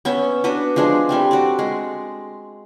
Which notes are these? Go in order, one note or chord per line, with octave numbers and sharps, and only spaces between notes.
B3 C#4 E5
B3 D4 F#4 B4
F3 G#3 D4 G#4
G3 A3 C4
F#4 D5
G#3